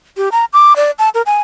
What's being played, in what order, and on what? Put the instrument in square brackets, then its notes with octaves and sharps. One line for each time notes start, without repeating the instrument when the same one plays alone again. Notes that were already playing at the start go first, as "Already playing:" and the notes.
[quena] G4
A#5
D6
D5
A5
A#4
G#5